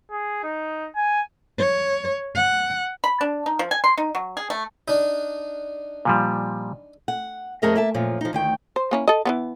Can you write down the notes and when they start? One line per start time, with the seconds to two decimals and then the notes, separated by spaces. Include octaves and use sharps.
0.11 G#4
0.43 D#4
0.95 G#5
1.58 C#5
2.35 F#5
3.04 B5
3.21 D4
3.46 D#4
3.59 F3
3.71 G#5
3.84 C6
3.98 D#4
4.15 F#3
4.37 G#4
4.50 A3
4.88 D4 D#4
6.05 A#2 F3 G3
7.08 F#5
7.62 F2 A3 G#4 A#4 D#5 E5
7.76 A#3 E5 A5
7.94 F#2 A#2 F3
8.21 F3 D#4
8.33 D2 D#3 G5
8.76 C5
8.91 A#3 C#4 E4
9.08 A4 D#5
9.25 E3 A#3 B3